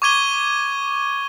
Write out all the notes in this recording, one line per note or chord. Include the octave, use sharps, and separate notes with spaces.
C#6 D6 G#6 D#7 G7